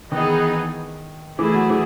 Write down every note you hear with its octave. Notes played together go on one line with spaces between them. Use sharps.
D#3 E3 B3 D#4 G#4
E3 A3 E4 G#4
F#3
E3